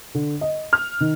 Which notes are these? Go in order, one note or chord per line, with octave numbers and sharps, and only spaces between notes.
D3
D#5
F6
D#3